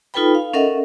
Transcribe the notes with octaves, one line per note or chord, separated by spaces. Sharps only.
D#4 F4 A4 B4 G5 B5
F5
C#4 A4 A#4 D#5 E5 F#5